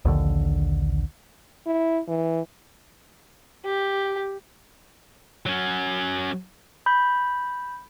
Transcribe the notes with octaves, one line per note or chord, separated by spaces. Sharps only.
A#1 D#2 D3
E4
E3
G4
F#3 C#4
B5 G6